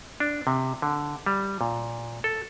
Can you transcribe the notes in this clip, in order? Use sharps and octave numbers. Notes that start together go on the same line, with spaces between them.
D4
C3
D3
G3
A#2
A4